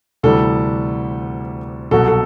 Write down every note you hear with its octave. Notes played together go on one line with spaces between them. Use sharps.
D2 C3 E3 G3 A4
C2 B2 F#3 A4
A4